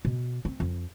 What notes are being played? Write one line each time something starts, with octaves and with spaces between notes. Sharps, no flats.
B2
C4
F2